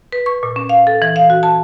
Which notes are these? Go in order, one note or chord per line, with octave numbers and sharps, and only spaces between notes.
B4
C#6
A#2
C#4
F5
A4
E3
F5
F#4
A5